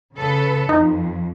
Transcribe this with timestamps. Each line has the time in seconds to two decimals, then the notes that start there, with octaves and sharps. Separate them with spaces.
0.14 C#3 A4 B4
0.69 F2 D#4